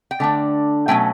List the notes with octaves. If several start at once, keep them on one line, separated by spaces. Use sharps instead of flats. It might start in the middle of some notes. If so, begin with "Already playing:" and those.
G5
D3 A3 D4
B2 F#3 A3 C#4 G5